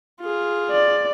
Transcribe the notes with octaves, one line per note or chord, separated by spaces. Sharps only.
F4 G#4
D5